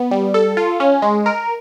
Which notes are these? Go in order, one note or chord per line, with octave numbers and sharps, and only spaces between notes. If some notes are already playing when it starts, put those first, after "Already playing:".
Already playing: B3
G3
A4
F4
C#4
G#3
A#4